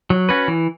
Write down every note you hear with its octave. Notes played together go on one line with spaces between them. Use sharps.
F#3
C#4 F#4 B4
E3